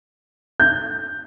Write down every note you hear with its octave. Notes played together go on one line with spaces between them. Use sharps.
G6